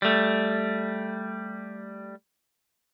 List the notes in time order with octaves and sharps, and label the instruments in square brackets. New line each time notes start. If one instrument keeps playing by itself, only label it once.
[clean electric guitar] G3 A3